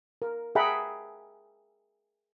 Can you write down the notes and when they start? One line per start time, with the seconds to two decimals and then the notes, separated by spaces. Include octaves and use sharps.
0.22 A#4
0.55 G#4 E5 F#5 G5 A#5 B5